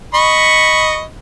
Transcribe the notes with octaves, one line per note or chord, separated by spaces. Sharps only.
D#5 B5 C#6